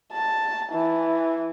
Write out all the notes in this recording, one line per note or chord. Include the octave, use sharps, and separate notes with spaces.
A5
E3